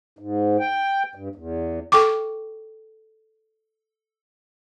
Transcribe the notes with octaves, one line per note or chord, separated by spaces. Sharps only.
G#2
G5
G2
E2
A4 G5 C#6 D6